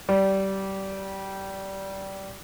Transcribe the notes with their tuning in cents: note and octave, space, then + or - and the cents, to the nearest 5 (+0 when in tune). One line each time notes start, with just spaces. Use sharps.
G3 -20